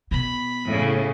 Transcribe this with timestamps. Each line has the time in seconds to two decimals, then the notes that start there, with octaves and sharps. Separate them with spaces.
0.11 B2 B5
0.68 A2 C#3